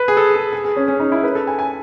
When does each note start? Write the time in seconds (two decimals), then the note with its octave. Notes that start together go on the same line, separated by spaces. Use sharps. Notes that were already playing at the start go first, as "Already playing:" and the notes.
Already playing: B4
0.08 G#4
0.17 A4
0.35 G#4
0.53 G#4
0.64 G#4
0.76 C#4
0.88 C#4
1.00 D#4
1.12 E4
1.23 B4
1.35 A4
1.47 G#5
1.59 G#5